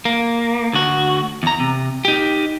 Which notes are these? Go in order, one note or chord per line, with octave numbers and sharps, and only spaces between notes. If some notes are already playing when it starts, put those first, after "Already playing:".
A#3
D2 F#4
E2 A#5
C3
D#4 G4